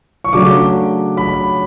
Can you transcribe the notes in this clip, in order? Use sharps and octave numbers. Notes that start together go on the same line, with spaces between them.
C#6
C#3 F#3 A3 D4 D6
B5